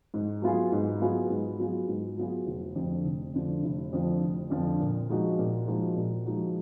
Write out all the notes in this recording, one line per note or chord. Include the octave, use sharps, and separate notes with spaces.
G#2
F#3 B3 F4 G#4
G#2
F#3 B3 F4 G#4
G#2
F#3 B3 F4 G#4
G#2
F#3 B3 F4 G#4
F1
F2 D3 F3
F1
F2 D3 F3
F1
F2 D3 F3
F1
F2 D3 F3
A#2
F3 G#3 D#4 F#4
A#2
F3 G#3 D#4 F#4
A#2
F3 G#3 D#4 F#4